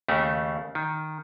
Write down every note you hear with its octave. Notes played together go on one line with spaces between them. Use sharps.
D#2 C#3 A3
D#3